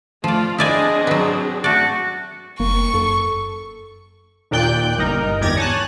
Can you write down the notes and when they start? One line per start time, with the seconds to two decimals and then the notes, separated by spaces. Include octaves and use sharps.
0.24 F3 A3 F4 D5
0.58 C4 D4 E4 G#4 D5 D#5 G#5
1.07 F#3 B3
1.64 A3 F#4 D5
2.60 F#1 A#3 C#6
2.94 F#2 A4
4.51 D#2 A#2 D5 G5 F#6 G6
4.98 G1 D#4 A#4
5.41 G#1 E2 G4 D5 G#6 A#6
5.57 C#5 G#5 A5 F#6